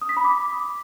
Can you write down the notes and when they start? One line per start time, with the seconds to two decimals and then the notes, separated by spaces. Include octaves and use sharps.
0.01 D#6
0.09 B6
0.17 B5
0.24 D6